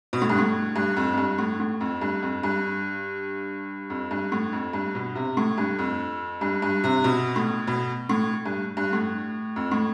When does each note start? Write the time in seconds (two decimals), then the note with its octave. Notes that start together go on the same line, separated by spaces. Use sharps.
0.13 B2
0.22 A2
0.29 G2
0.38 A2
0.76 G2
0.97 F2
1.13 F2
1.18 G2
1.38 A2
1.60 A2
1.81 F2
2.01 G2
2.22 F2
2.43 G2
3.90 F2
4.11 G2
4.32 A2
4.53 F2
4.73 G2
4.95 B2
5.15 C3
5.37 A2
5.58 G2
5.79 F2
6.41 G2
6.62 G2
6.84 C3
7.04 B2
7.36 A2
7.67 B2
8.09 A2
8.46 G2
8.77 G2
8.93 A2
9.56 F2
9.71 A2